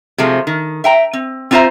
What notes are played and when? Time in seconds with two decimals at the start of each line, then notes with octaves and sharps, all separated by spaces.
0.18 C3 F3 G#3 A3
0.47 D#3
0.84 E5 G5 A#5
1.13 C4
1.51 C4 D4 F4 C5 E5 A#5